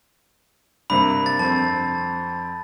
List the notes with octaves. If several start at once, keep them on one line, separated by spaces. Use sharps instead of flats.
G2 C3 A#3 B5
A6
F2 C4 A5